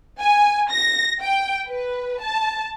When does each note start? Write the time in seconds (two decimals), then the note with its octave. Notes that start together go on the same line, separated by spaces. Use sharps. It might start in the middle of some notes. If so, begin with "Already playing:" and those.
0.20 G#5
0.71 A#6
1.21 G5
1.67 B4
2.21 A5